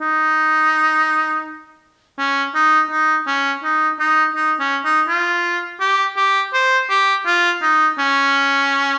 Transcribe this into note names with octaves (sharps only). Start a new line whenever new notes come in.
D#4
C#4
D#4
D#4
C#4
D#4
D#4
D#4
C#4
D#4
F4
G4
G4
C5
G4
F4
D#4
C#4